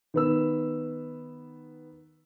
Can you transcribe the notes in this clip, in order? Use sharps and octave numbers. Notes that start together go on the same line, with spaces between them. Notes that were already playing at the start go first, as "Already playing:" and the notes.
D#3 B3 E6